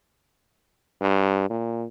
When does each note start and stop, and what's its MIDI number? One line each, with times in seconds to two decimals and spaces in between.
1.01 1.47 43
1.50 1.86 46